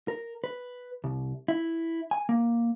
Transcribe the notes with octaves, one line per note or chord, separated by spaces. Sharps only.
A#4
B4
C2
E4
G#5
A#3